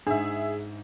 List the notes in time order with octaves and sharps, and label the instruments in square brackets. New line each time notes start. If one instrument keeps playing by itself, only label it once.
[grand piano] G#2 [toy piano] D4 [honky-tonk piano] G#4 E5